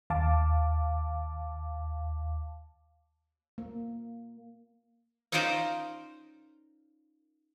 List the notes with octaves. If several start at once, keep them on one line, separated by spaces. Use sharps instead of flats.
D#2 F5 A5 D6
A#3
C#4 D#4 F4 A#4 C5 D5